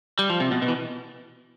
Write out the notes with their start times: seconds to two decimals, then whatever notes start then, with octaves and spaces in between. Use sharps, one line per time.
0.19 G3
0.30 F3
0.40 C3
0.51 B2
0.62 B2
0.68 E3